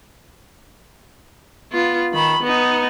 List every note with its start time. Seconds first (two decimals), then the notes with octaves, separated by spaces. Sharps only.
1.72 B3 F4
2.13 D#3 B5
2.43 B3 D#4